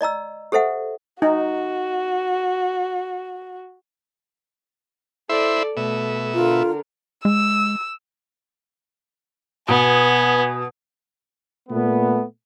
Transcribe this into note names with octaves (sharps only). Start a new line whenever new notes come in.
D5 D#5 A#5 E6
G4 A4 C5 E5 F#5
D#4 F#4
E4 A4 C5 D5 E5
B2 A3 E5
D3 F4 A#4
G#3 E6
B2 B3 G#5
A#2 A3 B3